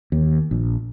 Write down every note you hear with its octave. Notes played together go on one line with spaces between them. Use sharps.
D#2
A#1